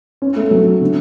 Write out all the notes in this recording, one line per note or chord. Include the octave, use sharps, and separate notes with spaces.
C#4
A3
F#3
D3